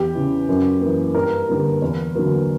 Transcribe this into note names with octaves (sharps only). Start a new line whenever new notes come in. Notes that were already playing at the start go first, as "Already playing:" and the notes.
Already playing: E2 G4
C#3 E3
F#2
E3 A#3
G2 A#4
D3 G3 A#3
E2
D3 F#3 A#3